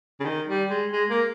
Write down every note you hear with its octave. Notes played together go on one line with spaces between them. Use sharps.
C#3
D#3
G3
G#3
G#3
A#3